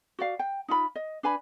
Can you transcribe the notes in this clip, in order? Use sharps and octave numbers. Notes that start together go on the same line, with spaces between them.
F#4 D5 F5
G5
D#4 F4 B5
D#5
D4 B4 G#5 B5